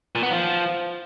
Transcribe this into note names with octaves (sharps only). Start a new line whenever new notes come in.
A#2
B3
F3